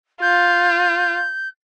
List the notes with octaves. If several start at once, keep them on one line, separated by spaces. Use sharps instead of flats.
F4 G6